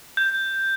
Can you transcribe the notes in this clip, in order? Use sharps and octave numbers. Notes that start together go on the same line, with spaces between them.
G6